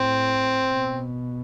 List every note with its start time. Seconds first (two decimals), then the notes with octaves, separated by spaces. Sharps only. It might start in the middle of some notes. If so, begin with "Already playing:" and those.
Already playing: A2 C4
0.73 B2